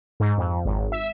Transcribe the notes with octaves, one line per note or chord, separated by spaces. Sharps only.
G#2
F2
G#1
E5